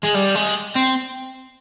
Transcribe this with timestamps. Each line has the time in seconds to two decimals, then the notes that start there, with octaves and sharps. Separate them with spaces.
0.03 G#3
0.14 G3
0.35 G#3
0.76 C4